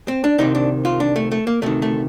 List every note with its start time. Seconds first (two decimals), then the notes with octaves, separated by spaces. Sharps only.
0.08 C4
0.24 D4
0.38 C2 C3 D#3 D#4
0.55 D4
0.85 F4
1.00 D4
1.16 A3
1.32 A3
1.47 A#3
1.62 D2 C3 D#3 A3
1.82 A3